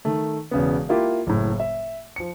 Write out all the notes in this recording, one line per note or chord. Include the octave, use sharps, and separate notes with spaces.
D#3 A3
E1 C#3 B3
A#3 E4 F4 G4
F#1 A2
E5
F3 C#7